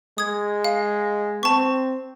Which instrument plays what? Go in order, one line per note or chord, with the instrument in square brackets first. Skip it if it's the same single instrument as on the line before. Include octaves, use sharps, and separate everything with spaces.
[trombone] G#3 [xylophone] D#6 G#6
[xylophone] F5
[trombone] C4 [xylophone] A5 C#6